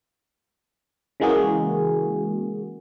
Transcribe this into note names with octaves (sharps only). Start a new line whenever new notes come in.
C#3 E3 G#3 A#3 F#4 G#4